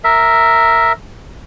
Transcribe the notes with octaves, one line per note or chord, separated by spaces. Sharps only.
A#4 E5